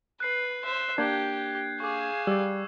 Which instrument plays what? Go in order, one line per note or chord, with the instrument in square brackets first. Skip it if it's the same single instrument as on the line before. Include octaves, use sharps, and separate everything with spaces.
[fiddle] B4 [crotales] F#6 C7
[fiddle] C5 E5
[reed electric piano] A#3 D4 [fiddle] G4 [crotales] G6 G#6
[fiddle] G#4 F5 [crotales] C#6 D6
[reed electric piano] G3 D5 [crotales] E6